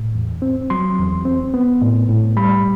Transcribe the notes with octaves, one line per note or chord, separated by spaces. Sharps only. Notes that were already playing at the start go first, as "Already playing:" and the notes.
Already playing: A2
E2
C4
F#3 C6
E2
C4
B3
A2
A2
G3 B5